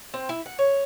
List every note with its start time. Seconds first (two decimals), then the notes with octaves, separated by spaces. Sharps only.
0.14 C4
0.29 E4
0.46 F#5
0.59 C#5